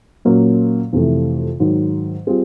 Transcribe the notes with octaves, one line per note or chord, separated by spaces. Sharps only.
A#2 F#3 A#3 C#4
F2 C3 E3 A3
G#2 D#3 F#3
G3 C4 F4 G#4